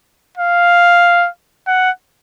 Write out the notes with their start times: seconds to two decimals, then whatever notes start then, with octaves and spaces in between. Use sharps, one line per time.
0.37 F5
1.67 F#5